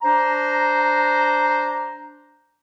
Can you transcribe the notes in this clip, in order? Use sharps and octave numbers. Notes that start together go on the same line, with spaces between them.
D4 C5 A#5